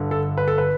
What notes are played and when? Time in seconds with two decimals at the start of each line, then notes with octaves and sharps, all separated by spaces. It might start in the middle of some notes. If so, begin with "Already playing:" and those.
Already playing: G1 G2 D3
0.11 A4
0.38 B4
0.48 A4
0.58 B4